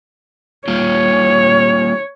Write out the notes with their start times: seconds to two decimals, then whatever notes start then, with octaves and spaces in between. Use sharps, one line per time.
0.68 G3 A#3 F4 C#5